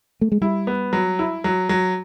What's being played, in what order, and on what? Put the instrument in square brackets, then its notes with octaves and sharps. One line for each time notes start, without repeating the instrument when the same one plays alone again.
[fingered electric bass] A3
G#3
[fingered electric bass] G3 [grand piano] E4
[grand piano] B3
F#3
E4
F#3
F#3